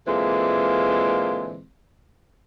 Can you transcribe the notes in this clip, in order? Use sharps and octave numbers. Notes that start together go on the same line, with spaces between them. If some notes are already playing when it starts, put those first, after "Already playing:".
A#2 D3 E3 G#3 A#3 C4